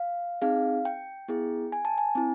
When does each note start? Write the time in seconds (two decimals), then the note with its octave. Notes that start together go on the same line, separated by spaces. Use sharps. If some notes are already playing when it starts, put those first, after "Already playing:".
Already playing: F5
0.42 C4 D#4 G#4 F5
0.85 G5
1.28 B3 E4 G#4
1.72 G#5
1.85 A5
1.98 G#5
2.15 C4 E4